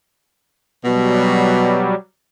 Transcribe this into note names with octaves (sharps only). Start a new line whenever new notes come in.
B2 F#3 G3